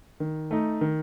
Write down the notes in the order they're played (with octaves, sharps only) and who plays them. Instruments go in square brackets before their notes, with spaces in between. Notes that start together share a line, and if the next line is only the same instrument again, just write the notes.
[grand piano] D#3
A3 D#4
D#3